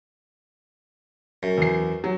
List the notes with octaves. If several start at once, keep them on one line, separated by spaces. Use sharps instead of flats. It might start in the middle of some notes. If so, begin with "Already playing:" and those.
F#2
E2 C7
F#3